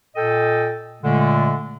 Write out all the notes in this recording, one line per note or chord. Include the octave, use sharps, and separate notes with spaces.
A#2 A4 D#5 G5
A#2 D3 G#3 A3